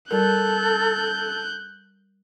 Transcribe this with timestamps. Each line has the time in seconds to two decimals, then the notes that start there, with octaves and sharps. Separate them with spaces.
0.11 G3 A4 A#4 F#6 G6